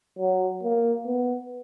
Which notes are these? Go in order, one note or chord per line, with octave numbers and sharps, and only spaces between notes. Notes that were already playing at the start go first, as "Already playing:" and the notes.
F#3
A#3
B3